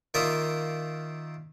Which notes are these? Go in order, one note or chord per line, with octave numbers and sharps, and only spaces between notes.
D#3 A#3 F4 D5 E5 D#6